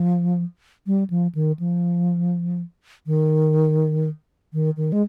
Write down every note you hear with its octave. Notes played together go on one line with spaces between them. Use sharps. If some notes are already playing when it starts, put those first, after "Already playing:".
Already playing: F3
G3
F3
D#3
F3
D#3
D#3
D#3
G#3